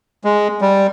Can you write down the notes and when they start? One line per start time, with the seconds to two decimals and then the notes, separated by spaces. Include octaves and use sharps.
0.24 G#3
0.61 G3